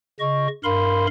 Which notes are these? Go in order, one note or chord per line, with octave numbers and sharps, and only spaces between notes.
C#3 D#5 C#6
G2 A#4 F5 B5 C6